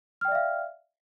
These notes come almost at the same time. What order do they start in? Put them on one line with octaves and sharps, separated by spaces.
F6 G5 D5 E5 F5